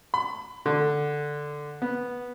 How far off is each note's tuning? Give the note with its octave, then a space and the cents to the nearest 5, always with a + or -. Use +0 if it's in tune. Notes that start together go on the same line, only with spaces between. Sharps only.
B5 +30
D3 +5
B3 -10